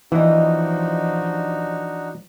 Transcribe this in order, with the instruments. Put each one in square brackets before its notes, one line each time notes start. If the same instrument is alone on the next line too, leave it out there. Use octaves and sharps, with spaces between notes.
[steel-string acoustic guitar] D#2 D#5 [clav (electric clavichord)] E3 [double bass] F3 [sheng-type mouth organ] D4 D#4 F#4